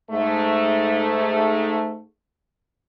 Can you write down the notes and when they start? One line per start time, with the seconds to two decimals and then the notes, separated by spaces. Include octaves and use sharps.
0.10 G#2 A3